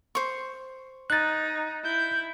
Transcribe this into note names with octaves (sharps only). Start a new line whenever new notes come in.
C5 C#6
D#4 F#6 A6
E4 G6